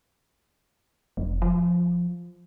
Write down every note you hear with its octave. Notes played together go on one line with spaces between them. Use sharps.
F1
F3